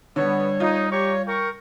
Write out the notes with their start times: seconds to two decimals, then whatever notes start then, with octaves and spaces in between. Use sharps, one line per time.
0.16 D3 G3 B3 C#5
0.60 D#4 F4
0.91 G4 C#5 A#5 C#6
1.27 A#4 G5 C#6